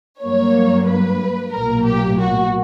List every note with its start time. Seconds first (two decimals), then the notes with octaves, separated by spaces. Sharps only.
0.21 G2 F#3 A#3 C#5
0.87 B4
1.52 B1 A#2 F#3 A#3 A#4
1.85 G4
2.18 F#4